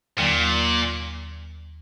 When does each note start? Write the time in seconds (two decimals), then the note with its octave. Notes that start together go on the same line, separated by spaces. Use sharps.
0.19 D#2 A#2 D3 F#3